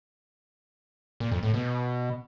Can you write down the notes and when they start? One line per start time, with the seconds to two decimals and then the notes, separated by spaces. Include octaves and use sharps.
1.20 A#2
1.32 F2
1.43 A2
1.54 B2